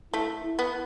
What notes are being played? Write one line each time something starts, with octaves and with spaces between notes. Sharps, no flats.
A3 E4
E4
B3